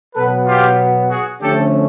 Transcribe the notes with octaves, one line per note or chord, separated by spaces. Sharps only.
B2 F#3 B3 A4 B4
F4 G4
F#4 G#4
D3 F3 A3 C#4 G4 A4